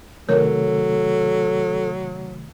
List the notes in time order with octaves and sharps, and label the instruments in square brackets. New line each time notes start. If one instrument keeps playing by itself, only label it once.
[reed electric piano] C3 D#3 A3 [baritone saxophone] F#3 [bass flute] A4 [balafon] A#4 C#5